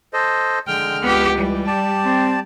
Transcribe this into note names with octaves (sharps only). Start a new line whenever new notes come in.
A4 C5 D#5
D3 G#3 G5 F6
C#2 B3 G4
E3 G3
G4 D5 A5
C4